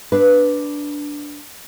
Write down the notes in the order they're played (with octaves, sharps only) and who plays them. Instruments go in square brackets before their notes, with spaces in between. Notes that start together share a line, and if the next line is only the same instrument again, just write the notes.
[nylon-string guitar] D4 B4